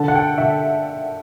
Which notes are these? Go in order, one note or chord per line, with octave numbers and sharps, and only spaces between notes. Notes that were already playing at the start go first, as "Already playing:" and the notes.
Already playing: D3 A5
F#5
G5
D3 E5